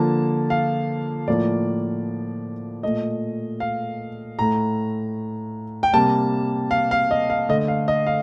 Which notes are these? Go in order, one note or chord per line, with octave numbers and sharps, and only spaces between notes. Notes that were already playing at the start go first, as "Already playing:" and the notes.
Already playing: D3 F3 A#3 A5
F5
A2 F3 A#3 D5
A#2 A3 D#5
F5
A2 A3 A#5
G5
C3 G3 A#3 A5
F5
F5
D#5
F5
D3 A3 D#5
F5
D#5
F5